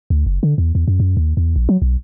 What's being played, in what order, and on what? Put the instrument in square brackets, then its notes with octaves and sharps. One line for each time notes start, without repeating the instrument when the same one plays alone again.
[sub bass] D2
F#1
D3
E2
E2
F#2
F#2
D#2
E2
A#1
F#3
B1